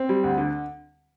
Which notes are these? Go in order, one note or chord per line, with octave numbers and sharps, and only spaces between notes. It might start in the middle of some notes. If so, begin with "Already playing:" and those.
Already playing: C4
G3
D2
D3